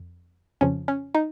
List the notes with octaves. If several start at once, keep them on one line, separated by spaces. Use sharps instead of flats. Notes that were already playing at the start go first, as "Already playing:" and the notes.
Already playing: F2
F2 C#3 F3 C#4
C#4
D#4